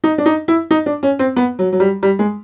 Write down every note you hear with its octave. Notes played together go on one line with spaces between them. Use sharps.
D#4
D4
D#4
E4
D#4
D4
C#4
C4
B3
F#3
F#3
G3
G3
G#3